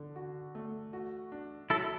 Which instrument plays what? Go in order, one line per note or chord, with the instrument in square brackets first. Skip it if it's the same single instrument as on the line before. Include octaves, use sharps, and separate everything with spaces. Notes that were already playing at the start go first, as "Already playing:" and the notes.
Already playing: [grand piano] D3
F#4
A3
F#4
D4
[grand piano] F#3 [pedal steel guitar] E4 A4